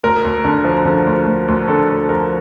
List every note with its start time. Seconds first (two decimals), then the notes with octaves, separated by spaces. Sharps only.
0.03 D2 A#4
0.25 D2
0.44 D3
0.65 F3
0.85 D3
1.07 D2
1.27 D2
1.48 D2
1.68 D3 A4
1.89 D2
2.09 F3 A#4